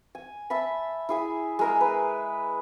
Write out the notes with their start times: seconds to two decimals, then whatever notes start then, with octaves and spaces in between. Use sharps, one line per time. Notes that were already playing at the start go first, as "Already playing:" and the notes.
0.15 G#5
0.50 E5 A5 B5
1.09 E4 G#4 G#5
1.59 G#3 A#4 A#5
1.81 B4